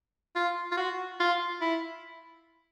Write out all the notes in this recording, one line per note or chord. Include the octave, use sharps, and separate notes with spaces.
F4
F4
F#4
F4
E4